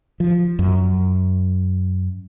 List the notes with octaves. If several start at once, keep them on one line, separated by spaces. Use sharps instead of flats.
F3
F#2